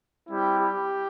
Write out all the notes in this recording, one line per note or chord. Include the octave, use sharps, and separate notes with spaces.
G3 C4 E4 G4
G4